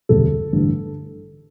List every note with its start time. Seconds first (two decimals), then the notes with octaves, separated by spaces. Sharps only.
0.09 E1 D2 C3 G3 A4
0.53 A1 G2 D3 A3